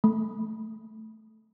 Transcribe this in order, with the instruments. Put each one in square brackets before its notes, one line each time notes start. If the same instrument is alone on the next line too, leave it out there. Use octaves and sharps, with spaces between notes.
[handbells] A3